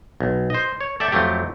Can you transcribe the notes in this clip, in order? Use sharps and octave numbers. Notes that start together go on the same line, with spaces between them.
B1
C5 D#5
C#5
A4 D5 E5 G5 A5
F2 F#3 A3 G4